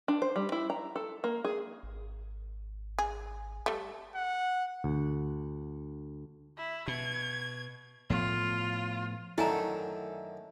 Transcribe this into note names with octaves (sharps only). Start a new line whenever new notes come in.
D4
C5
G3
E4
A#5
A4
A#3
G#4
G#1
G#4
G3 A3
F#5
D2
E4
B2 G#6
A2 F3 B3 F4
F#2 D3 D#3 A3 E4 G#5 A#5